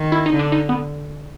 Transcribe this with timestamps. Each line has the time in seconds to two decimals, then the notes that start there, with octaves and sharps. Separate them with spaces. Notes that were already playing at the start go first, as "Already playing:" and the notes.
Already playing: D#3
0.12 E4
0.26 D#4
0.32 D3
0.39 D4
0.52 D#4
0.69 B3